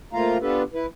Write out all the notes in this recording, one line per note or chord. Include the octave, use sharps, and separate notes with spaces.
F3 A3 A#3 F4 F5 A#5
B3 D4 F4 G4 A4 B4
E4 B4